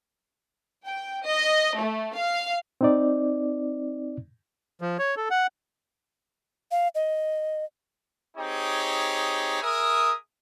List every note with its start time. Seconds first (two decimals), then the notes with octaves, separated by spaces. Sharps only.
0.88 G5
1.25 D#5
1.78 A3
2.17 F5
2.81 C4 D#4 D5
4.82 F3
4.99 C#5
5.17 A4
5.30 F#5
6.71 F5
6.95 D#5
8.37 C4 D#4 G4 G#4 C#5
9.62 G#4 A#4 E5 D#6